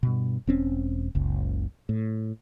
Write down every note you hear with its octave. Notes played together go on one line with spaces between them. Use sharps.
G2 B2
E1 C4 C#4
F#1 C#2
A2